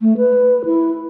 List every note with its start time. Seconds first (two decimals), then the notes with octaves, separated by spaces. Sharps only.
0.01 A3
0.18 B4
0.65 E4